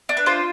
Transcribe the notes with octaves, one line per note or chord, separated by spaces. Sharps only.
D4
B4
F4 C5